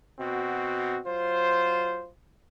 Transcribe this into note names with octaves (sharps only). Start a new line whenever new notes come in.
B2 C4 F#4
F#3 F4 C5